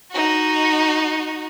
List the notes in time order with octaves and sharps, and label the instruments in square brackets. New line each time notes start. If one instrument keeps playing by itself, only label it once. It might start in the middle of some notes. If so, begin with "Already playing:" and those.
[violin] D#4 F#4